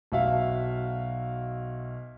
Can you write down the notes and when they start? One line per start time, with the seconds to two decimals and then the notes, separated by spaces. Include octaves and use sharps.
0.12 B1 F#4 E5 F5